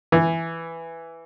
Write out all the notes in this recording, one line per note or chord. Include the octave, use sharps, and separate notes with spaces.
E3